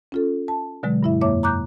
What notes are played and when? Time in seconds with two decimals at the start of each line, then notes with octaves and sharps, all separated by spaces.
0.12 C#4 F4 A4
0.48 A5
0.83 B2 D3 F#3 G#3
1.03 G2 E4 E5
1.21 F2 A#3 C#5 E5 D6
1.43 A#5 D6 F#6 G6